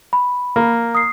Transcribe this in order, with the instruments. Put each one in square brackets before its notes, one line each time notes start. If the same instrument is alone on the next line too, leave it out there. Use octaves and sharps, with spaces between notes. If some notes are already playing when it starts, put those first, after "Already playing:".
[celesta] B5
[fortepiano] A#3
[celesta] D#6 C7